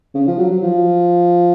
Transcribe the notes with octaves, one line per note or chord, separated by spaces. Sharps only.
C#3
F3
F#3
F#3
F3